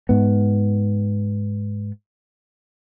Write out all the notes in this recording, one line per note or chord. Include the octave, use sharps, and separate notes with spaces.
G#2 B3